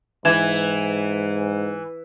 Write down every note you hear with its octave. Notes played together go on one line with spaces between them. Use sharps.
G#2 E3 E5 G#6 E7